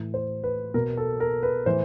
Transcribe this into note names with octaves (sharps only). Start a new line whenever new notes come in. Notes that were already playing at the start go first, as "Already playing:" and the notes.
Already playing: A2 E3
C5
B4
B2 A#4
A4
A#4
B4
A2 E3 C5